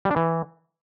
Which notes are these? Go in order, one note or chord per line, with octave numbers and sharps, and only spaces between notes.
G3
D4
E3